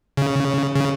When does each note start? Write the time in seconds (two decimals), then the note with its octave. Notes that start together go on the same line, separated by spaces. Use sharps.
0.17 C#3
0.76 C#3